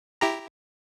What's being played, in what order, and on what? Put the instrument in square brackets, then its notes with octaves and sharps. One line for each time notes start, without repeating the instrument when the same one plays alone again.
[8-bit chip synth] E4 G4 A#5